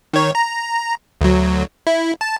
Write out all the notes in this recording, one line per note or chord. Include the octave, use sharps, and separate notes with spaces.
D#3 C#5
A#5
D2 F#3
E4
A5